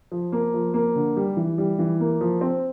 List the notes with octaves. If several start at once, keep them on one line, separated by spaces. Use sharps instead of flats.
F3
A#3
F3
A#3
D3
G3
E3
G3
E3
A#3
F3
C4